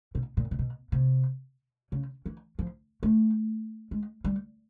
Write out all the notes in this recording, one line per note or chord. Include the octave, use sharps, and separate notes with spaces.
B2
A#2
C3
B2
C3
C#3
E3
F3
A3
G#3
G3